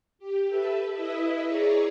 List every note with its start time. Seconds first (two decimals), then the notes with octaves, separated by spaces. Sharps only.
0.19 G4
0.47 A4 B4 E5
0.92 E4 B4 D#5 E5
1.44 G#4 C#5 D5 A#5